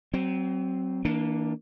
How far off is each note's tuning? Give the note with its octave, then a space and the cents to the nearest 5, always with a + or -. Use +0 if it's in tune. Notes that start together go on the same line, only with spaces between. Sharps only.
F#3 +35 C4 +0
E3 -40 A#3 +0 D4 +0